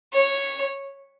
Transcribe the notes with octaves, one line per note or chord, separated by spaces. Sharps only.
C#5